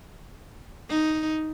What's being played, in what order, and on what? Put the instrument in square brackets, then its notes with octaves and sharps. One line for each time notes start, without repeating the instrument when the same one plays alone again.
[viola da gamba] D#4